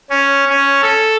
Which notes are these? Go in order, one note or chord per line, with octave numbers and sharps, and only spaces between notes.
C#4
C#4
A4